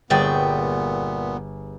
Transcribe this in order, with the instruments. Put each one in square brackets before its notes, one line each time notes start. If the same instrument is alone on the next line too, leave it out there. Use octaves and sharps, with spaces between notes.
[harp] G1 G#4 C#6 [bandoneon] A#2 B3 [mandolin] D5 E5 G5